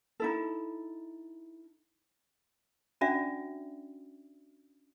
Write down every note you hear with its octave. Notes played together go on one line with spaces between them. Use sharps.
D#4 E4 A4
C#4 D4 F#4 D5 E5